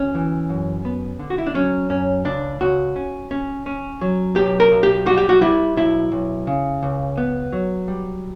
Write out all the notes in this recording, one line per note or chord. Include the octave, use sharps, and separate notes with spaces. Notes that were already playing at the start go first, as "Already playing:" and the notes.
Already playing: D2 C#4
E3
F#2
B3
D3
F#4
E4
D4
F#3 C#4
F#2 C#4
C#2 D4
C#2 F#4
C#4
C#4
C#4
F#3
B1 G4
A#4
B1
G4
G3 F#4
G4
F#4
G3 E4
B1 E4
B1
C#3
C#2
B3
F#3
G3